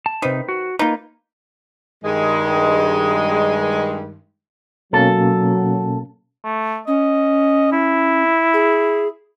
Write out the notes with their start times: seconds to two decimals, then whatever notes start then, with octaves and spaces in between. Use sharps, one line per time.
0.06 A5
0.22 C3 D#3 D#4 B4 C5
0.48 F#4
0.79 A#3 D#4 F4 B4
2.04 G2 D#3 G#3
4.93 B2 F#3 A#3 C#4 A4
6.44 A3
6.87 C#4 D#5
7.73 E4
8.54 G#4